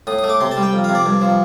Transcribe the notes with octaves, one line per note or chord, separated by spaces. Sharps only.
A2 D#6
D#6
A3
D6
C3 C6
A5
G3
G5
F2
C3 F5
D5
G2
F3